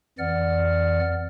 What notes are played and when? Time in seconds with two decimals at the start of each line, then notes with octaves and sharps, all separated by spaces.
0.19 F2 E3 D5 F#5 F6